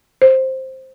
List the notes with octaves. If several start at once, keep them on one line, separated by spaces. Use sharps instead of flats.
C5